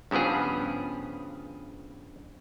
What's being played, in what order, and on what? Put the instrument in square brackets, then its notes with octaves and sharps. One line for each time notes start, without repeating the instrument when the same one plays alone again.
[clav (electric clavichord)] G2 C#3 F3 B3 G#4